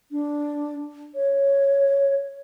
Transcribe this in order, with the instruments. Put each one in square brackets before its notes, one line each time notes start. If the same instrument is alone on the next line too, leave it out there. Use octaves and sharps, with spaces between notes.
[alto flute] D4
C#5